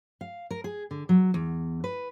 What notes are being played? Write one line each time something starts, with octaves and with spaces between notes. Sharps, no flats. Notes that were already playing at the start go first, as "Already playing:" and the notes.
F5
A#4
G#4
D3
F#3
E2
B4